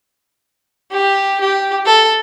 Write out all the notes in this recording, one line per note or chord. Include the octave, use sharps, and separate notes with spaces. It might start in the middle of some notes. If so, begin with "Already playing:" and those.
G4
G4
A4